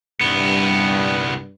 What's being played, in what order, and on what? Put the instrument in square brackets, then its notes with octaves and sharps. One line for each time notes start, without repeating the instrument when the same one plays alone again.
[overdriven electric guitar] C2 B3 [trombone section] G2